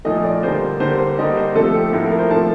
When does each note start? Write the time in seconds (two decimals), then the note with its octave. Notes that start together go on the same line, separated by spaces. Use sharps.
0.05 A#2 F3 A3 D#5
0.24 D5
0.43 D3 G3 A#3 C5
0.80 D3 G3 A#3 C5
0.99 C5
1.18 D3 G3 A#3 D#5
1.37 C5
1.55 C3 F3 A3 A4
1.75 G4
1.93 A2 F3 A#3
2.06 A#4
2.19 C5
2.31 C3 F3 A3 A5